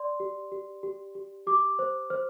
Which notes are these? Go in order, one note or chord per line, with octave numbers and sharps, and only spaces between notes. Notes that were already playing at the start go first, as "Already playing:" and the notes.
Already playing: D5 C6
G4
G4
G4
G4
G4 D6
C5
C5 F6